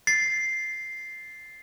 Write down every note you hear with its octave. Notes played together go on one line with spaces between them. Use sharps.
A6 C7